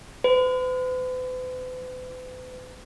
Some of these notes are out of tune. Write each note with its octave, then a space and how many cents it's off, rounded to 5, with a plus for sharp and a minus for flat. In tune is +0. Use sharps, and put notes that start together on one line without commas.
B4 +45